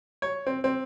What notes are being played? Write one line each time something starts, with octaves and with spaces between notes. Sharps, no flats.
C#5
C4
C4